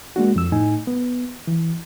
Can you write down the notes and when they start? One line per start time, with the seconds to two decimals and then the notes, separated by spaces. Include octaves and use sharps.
0.16 G#3 A#3 D4 F#4
0.36 F2 E6
0.52 A2 D#4 G#5
0.87 B3
1.47 E3